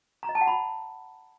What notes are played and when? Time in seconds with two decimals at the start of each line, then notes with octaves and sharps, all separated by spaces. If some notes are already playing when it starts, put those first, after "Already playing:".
0.23 A#5
0.29 D#5
0.35 A5
0.41 F#5
0.47 B5